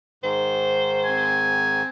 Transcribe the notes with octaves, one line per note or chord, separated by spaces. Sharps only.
G#2 D#3 C5
C4 G#5